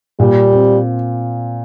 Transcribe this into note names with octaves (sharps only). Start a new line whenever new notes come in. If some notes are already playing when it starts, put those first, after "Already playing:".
A#2 G3
C4